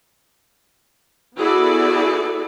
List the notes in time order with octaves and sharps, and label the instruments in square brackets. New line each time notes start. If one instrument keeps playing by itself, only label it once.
[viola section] B3 E4 F#4 G#4 A4 D5